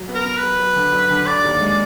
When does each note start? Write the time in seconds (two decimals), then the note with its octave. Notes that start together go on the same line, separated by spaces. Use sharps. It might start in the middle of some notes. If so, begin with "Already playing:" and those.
Already playing: F#3
0.08 B3
0.15 A#4
0.25 B3
0.37 B4
0.43 F#3
0.59 F#3
0.76 D3
0.93 F#2
1.11 D3
1.27 D3 D5
1.44 D#2
1.60 G#3